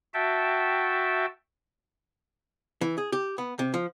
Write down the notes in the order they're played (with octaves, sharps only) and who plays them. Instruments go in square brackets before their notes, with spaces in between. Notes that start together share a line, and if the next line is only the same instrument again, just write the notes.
[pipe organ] F#4 E5 G5 A5
[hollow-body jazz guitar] E3
G#4
G4
B3
C3
F3